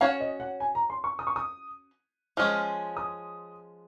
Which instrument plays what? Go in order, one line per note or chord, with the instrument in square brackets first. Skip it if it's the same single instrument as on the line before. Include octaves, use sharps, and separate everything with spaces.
[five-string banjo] C#4 F#4 C#5 [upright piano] F5
[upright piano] D#5
F#5
G#5
A#5
C6
C#6
D#6
C#6
D#6
[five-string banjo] F3 G#3 C#4 [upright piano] F6
[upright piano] D#6